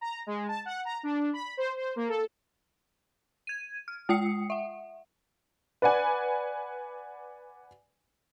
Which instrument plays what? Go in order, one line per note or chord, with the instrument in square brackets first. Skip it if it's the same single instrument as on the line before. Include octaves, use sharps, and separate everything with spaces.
[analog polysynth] A#5
G#3
A5
F#5
A#5
D4
B5
C5
C5
A#3
A4
[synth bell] G#6 D#7
F6
G#3 F4 G5 D#6 C7 C#7
E5 F#5
[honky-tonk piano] B4 D5 F#5 G#5